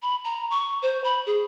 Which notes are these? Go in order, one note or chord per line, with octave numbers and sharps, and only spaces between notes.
B5
A#5
C#6
C5
B5
G#4